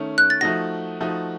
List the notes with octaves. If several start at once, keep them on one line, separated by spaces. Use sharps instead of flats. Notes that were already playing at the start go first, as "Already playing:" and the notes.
Already playing: D#3 A3 C#4
F#6
A6
F3 A3 D#4 F#4 A#6
F3 A3 D#4 F#4